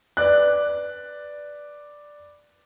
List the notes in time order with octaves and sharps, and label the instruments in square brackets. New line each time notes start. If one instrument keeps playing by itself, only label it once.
[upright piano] B4 D5 F#6